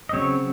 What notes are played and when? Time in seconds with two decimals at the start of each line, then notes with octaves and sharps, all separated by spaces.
0.09 D#5
0.13 C#3 F#3 C4 C#5